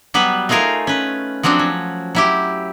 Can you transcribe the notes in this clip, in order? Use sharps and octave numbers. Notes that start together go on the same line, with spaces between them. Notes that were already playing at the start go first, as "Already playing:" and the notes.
F#3 G3 B3 B4
A3 D#4 F4 G#4 A#4 F5
C#4 B4
F3 F#3 C4 D4 F#4
C#4
F#3 E4 G4